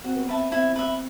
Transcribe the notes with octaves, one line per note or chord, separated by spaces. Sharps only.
C4 F#4
B3
C4 B4 E5 A5
C4 E4
B4 E5